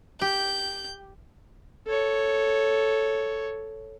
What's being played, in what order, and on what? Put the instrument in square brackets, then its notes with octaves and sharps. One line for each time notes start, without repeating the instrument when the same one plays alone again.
[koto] G4 [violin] G6
[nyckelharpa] A4 C#5